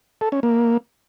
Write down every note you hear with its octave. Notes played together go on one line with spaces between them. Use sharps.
A4
C#4
A#3